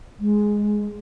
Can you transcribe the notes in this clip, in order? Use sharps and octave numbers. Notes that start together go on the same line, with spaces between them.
G#3